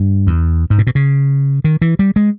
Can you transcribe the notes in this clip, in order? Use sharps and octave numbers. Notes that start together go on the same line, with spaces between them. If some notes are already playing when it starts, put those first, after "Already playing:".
Already playing: G2
E2
G#2
A#2
B2
C#3
D#3
E3
G3
G#3